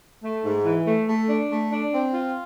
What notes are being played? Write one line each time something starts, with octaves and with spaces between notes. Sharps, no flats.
A3
G#2
E3
A3
A3
D4
A3
D4
C4
F4